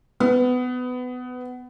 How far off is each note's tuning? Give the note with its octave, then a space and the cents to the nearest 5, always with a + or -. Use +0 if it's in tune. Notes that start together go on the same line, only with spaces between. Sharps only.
B3 +20